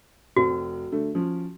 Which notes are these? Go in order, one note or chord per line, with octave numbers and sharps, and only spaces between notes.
F1 C4 F#4
D3 A3
F3 C#4